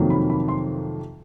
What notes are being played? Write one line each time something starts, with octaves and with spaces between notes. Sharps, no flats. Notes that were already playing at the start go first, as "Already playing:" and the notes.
Already playing: F2 C3 D#3 F#3 A#3
B5
B5
C6